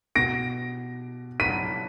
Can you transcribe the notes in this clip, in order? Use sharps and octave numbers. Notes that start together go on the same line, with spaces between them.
B2 A#6 D7
B6 D#7